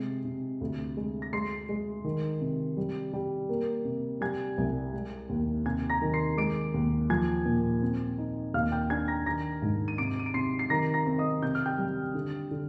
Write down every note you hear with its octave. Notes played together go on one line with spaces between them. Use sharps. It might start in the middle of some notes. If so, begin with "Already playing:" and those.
Already playing: C3 G#3 C7
C3
D2
G#3
A#6
G#3 C6 C7
G#3
D#3
C3
G3
G3
A#3
C3
G3 G#5 G#6
C2
G#3
D#2
C3 G#5 G#6
A#5 A#6
D#3
C6 C7
G#3 D6 D7
D#2
F3 G#5 G#6
A#2
C4
D#4
D#2 F5 F6
G5 G6
D4 G#5 G#6
A#5 A#6
D#3 A#5 A#6
G#2
D#7
C3 D6 D7
D#7
D7
C3 C6 C7
C7
D#3 A#5 A#6
A#5 A#6
C4
D#5 D#6
C3 G6
F6
G5 G6
G3
D3
D3